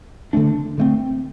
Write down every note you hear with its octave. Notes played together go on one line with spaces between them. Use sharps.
D3 A3 D4
D3 A3 C4